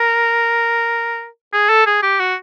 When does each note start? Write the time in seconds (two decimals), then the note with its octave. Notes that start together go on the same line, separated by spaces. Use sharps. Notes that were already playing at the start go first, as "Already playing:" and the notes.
Already playing: A#4
1.53 G#4
1.69 A4
1.86 G#4
2.02 G4
2.20 F#4